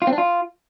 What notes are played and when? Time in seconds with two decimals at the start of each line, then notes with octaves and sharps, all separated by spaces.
0.02 F4
0.07 C4
0.13 D4
0.18 F4